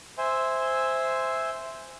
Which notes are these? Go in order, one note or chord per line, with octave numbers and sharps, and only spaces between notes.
C5 E5 G#5 C6